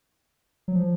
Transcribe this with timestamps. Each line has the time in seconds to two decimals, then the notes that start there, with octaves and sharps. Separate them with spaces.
0.68 F#3
0.75 F3